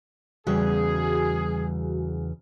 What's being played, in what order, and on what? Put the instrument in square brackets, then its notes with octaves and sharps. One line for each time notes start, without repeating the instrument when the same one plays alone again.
[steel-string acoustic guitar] E2 C#3 [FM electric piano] G3 F#4 [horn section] G#4